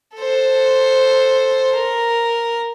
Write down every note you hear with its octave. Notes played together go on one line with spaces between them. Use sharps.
A4 C5
A#4